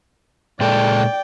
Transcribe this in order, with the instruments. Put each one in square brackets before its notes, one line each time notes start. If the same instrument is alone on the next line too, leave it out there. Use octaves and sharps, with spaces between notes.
[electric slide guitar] A#2 G#3 A4 [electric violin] D5 G5